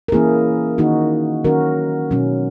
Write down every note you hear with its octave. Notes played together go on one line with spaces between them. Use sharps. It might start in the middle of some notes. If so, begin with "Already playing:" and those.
A#4
E3 A#3 C#4 E4 G#4
D#3 A#3 D#4 F#4
D#3 F#3 C#4 F#4 A#4
B2 F#3 C#4